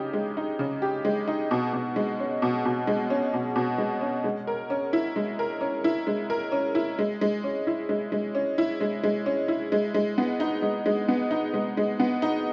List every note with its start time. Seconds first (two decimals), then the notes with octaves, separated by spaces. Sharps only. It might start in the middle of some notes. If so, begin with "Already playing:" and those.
Already playing: C#3 D#4 G4
0.13 G#3
0.37 D#4
0.59 C#3
0.82 G4
1.05 G#3
1.27 D#4
1.51 B2
1.73 B2
1.96 G#3
2.20 C#4
2.42 B2
2.65 B2
2.87 G#3
3.10 C#4
3.34 B2
3.56 B2
3.78 G#3
4.01 C#4
4.24 G#3
4.47 A#4
4.70 C#4
4.93 E4
5.16 G#3
5.39 A#4
5.61 C#4
5.84 E4
6.07 G#3
6.30 A#4
6.52 C#4
6.75 E4
6.99 G#3
7.21 G#3
7.44 C#4
7.67 E4
7.89 G#3
8.12 G#3
8.35 C#4
8.58 E4
8.81 G#3
9.04 G#3
9.26 C#4
9.48 E4
9.72 G#3
9.94 G#3
10.18 B3
10.40 D#4
10.62 G#3
10.86 G#3
11.08 B3
11.31 D#4
11.54 G#3
11.77 G#3
12.00 B3
12.22 D#4